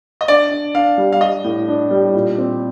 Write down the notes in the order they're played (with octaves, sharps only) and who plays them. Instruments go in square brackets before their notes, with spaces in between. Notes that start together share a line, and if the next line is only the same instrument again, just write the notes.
[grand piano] D#5
[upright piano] D4 [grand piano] D5
[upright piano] D4
[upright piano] D4 [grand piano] F5
[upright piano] G3
[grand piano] F5
[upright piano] G3 [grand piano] D#5
[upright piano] A2
D4
G3
A#2
C4